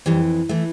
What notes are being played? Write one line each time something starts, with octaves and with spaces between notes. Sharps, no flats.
F2 E3 G3
E3 A3